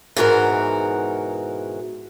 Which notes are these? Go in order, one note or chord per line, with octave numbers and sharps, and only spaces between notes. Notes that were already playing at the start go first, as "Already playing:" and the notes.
G#2 B2 E3 F#4 A#4